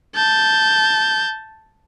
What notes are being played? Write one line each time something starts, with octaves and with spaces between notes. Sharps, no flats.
A5 G6